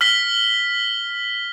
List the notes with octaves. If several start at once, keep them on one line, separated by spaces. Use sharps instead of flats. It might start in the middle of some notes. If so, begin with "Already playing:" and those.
F6 B6 G7